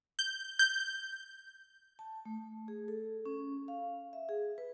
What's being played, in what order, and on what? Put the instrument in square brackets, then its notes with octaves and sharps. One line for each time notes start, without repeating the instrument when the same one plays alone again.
[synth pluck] G6
G6
[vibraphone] A5
A3
G#4
A4
C#4
F5
E5
G#4
B4